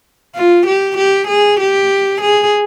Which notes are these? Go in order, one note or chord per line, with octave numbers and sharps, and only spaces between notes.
F4
G4
G4
G#4
G4
G#4